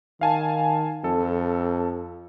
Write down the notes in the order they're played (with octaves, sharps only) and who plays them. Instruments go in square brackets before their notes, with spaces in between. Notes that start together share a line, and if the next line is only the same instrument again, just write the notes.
[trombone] D#3 [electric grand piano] F5 G#5 A5
[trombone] F2 [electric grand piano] A4